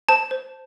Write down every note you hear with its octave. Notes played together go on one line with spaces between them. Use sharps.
C5 A5
C5